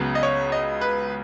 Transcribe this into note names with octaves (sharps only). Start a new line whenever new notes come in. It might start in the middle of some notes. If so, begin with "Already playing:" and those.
Already playing: C#2 C#3 F#3 B3
D#5
C#5
D#5
B4